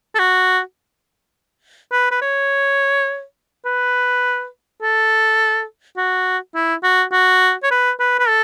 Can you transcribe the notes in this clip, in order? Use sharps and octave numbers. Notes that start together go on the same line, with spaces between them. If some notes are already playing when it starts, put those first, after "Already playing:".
A4
F#4
B4
B4
C#5
B4
A4
F#4
E4
F#4
F#4
C#5
B4
B4
B4
A4